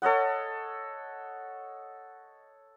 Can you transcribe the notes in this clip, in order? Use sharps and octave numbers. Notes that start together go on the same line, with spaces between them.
A4 C#5 D#5 F#5